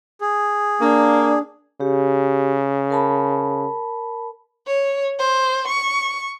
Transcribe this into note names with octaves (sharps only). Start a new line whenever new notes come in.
G#4
A#3 D4
C#3 G4
A#4 A5 B5
C#5
C5
C#6